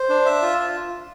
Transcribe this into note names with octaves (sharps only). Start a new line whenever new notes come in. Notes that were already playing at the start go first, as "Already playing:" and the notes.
Already playing: C5
D4
E5
F4